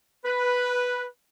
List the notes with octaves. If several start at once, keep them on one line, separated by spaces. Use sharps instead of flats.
B4